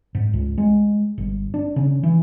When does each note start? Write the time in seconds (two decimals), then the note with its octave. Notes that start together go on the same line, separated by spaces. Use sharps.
0.15 G#2
0.34 C#2
0.58 G#3
1.18 G1
1.54 D4
1.76 C#3
2.03 E3